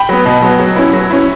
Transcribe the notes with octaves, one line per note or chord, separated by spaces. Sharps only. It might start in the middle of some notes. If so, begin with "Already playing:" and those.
Already playing: G5 B5
F#3 B3
B2
F#3 B3
F#3
C#4 E4
F#3
C#4 E4